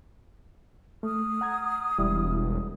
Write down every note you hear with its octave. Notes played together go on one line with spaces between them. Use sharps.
A3 D#6 F6
F#5 A#5 G#6
E1 G3 E4